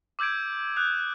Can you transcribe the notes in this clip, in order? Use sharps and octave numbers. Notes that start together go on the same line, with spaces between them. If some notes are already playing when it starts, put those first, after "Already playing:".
D6 E6 G6 G#6 D7
D#6 F#6 G6